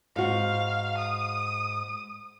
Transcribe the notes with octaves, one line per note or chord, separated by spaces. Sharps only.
G#2 F#4 F5
D#6